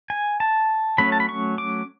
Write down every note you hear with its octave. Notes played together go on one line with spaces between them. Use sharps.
G#5
A5
F#3 A3 C#4 B5
A5
B5
C#6
D6